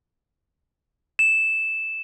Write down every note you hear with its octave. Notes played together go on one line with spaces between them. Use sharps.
E7